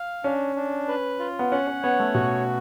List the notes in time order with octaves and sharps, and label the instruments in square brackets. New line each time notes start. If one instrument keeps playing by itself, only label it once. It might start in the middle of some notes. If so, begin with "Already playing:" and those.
Already playing: [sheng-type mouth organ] F5
[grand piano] C#4 [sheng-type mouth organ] D4
[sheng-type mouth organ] D4
B4
F4
[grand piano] B3
[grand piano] C#4 [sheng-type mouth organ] F#5
[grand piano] C#4
[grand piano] B3 [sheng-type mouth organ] C#5
[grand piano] A3
[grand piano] B2 [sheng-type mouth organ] F#4